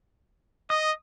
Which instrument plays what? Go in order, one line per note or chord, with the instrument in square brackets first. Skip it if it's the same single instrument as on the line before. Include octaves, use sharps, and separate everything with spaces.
[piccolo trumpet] D#5 [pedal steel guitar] D#6